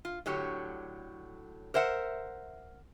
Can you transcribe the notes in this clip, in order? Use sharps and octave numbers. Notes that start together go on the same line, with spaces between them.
F4
A2 D3 F#3 G4 C#5
A#4 C5 E5 F#5